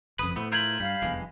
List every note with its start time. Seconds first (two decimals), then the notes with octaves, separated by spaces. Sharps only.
0.19 F#1 F2 B4 D#6
0.36 A2 A3 B3 C5
0.52 E4 F4 A#4 G6 G#6 F#7
0.80 G2 G3 F5
1.02 F1 E2 G2 E3 G#3